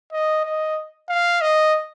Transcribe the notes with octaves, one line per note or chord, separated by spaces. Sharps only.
D#5
D#5
F5
D#5